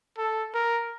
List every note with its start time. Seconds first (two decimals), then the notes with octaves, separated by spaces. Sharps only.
0.18 A4
0.54 A#4